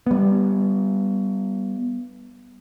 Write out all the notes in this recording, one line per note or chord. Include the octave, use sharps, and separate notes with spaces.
G3 B3